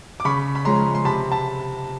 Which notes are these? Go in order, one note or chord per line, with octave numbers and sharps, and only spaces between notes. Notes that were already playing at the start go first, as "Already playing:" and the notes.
D6
C#3 B5 C#6
B5
F3 G#3 C#4 A#5 C6
C6
C3 A5 B5
A5 B5